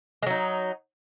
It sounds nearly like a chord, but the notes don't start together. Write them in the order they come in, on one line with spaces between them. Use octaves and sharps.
G#3 F#3 D#4